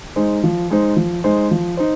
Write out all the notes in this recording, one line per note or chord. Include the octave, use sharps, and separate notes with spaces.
G#3 D#4 C5
F3
G#3 D#4 C5
F3
G#3 D#4 C5
F3
D#4 C5